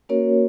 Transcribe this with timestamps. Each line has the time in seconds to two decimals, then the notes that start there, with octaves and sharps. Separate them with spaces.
0.09 A#3 C#4 F#4 A#4 C#5